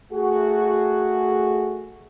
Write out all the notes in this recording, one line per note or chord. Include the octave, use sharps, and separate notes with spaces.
A3 F#4 G#4